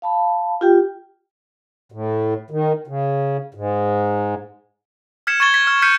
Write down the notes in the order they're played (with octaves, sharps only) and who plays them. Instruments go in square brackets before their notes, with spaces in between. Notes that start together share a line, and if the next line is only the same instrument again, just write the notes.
[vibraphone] F5 A5 B5
F4 G4 G5
[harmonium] A2
D#3
C#3
G#2
[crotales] F6 G#6 B6 C#7 E7
C#6 G#6 A6 G7
G#6 A6 B6
F6
F6 G6 B6 C#7 D#7